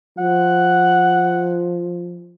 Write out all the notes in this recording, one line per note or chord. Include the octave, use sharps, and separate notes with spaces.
F3 F#5